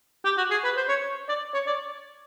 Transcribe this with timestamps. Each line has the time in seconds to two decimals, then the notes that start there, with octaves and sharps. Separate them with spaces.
0.25 G4
0.38 F#4
0.51 G#4
0.64 B4
0.77 C5
0.89 C#5
1.29 D5
1.53 C#5
1.67 D5